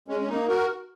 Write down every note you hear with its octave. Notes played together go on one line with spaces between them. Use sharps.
G#3 C#4
C#4
A#3 D#4
F#4 A#4